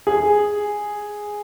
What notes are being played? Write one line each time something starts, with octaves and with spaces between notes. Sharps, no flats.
G#4